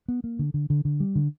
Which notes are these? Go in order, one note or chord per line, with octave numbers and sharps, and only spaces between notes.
B3
A#3
D3
D3
D3
D3
G3
D3